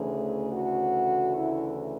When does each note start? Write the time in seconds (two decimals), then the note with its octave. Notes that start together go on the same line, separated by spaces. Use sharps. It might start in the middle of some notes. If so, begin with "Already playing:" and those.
Already playing: D2 C#3 E3 A3 G#4
0.51 F#4
1.35 E4